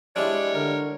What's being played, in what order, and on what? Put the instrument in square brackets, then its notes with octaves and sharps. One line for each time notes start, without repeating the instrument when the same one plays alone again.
[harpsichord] G3 G#3 E4 [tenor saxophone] D4 [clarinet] C#5
[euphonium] D3 [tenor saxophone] A#4